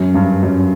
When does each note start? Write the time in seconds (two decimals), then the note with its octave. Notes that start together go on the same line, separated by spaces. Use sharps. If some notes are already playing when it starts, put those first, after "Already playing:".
Already playing: F#2
0.14 G2
0.43 F#2